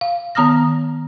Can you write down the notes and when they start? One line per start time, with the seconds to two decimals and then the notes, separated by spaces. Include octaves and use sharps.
0.01 F5
0.35 D#3 B3 A#5 D#6 F6 A#6